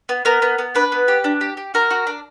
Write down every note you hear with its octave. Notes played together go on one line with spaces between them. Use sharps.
B3
B3 A#4
B3
B3
D4 B4
B3
G4
D4
G4
G4
F#4 A#4
F#4
D4